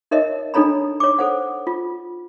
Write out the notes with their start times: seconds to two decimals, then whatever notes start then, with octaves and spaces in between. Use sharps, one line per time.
0.11 D#4 A#4 C#5 D#5 E5
0.54 D4 D#4 A4 C#5 A#5 B5
1.00 C#5 D6
1.19 A4 C5 F#5
1.67 F4